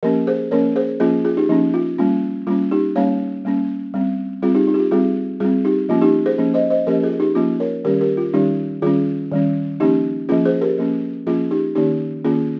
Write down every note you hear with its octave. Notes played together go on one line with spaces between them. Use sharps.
F3 A#3 C#4 G4 A#4
G#4 C5
F3 A#3 C#4 A#4 C#5
G#4 C5
F3 A#3 C#4 F4 G#4
F4 G#4
D#4 G4
F3 A#3 C#4 D#4
F4
G3 A#3 C#4 F4
G3 A#3 C#4 F4
D#4 G4
G3 A#3 C#4 C#5 F5
G3 A#3 C#4
G3 C4
G3 C4 F4 G#4
D#4 G4
D#4
G4
F4
G3 C4 F4 G#4
G3 C4 F4 G#4
D#4 G4
F3 A#3 C#4 F4
D#4 G4
G#4 C5
F3 A#3 C#4
C5 D#5
C5 D#5
F3 A#3 C#4 G4 A#4
F4 G#4
D#4 G4
F3 A#3 C#4 F4
A#4 C#5
D#3 G3 C#4 G4 A#4
G4 A#4
F4
D#3 G3 C#4 D#4 G4
D#3 G3 C#4 F4 G#4
D#3 G3 C#4
F3 A#3 C#4 D#4 G4
F3 A#3 C#4 F4 G#4
G#4 C5
G4 A#4
F3 A#3 C#4
F3 A#3 C#4 F4 G#4
D#4 G4
D#3 A#3 C#4 D#4 G4
D#3 A#3 C#4 F4 G#4